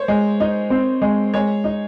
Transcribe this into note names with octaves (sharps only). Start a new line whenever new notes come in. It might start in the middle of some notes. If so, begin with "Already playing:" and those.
Already playing: C5 C#5
G#3
D#4
C4
G#3
G#3 C#5
D#4